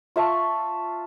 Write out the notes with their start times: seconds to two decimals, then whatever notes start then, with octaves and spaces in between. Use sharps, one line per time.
0.16 F4 E5 A5 C#6